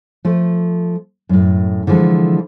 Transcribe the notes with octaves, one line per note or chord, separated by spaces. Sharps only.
F3 A3
F#2 A2
D3 E3 F3 G#3 A4